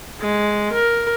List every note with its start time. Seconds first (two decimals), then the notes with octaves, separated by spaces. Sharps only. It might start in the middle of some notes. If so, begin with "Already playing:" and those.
0.21 G#3
0.74 A#4